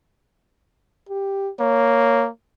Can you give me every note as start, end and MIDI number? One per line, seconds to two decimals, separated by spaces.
1.09 1.50 67
1.60 2.29 58
1.60 2.24 73